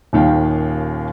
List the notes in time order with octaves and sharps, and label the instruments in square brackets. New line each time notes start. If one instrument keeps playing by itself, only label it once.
[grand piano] D#1 D#2 D#3 F5 G5